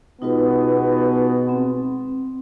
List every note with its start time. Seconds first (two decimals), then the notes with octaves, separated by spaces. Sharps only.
0.22 B2 G#3 B3 D#4 F4 B4
1.49 C4